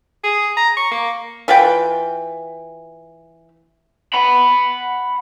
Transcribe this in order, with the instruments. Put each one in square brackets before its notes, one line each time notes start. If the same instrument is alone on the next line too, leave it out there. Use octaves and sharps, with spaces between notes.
[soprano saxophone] G#4
A#5
C#6
A#3
[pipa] E3 F4 B4 G5
[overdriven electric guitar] F#5 B5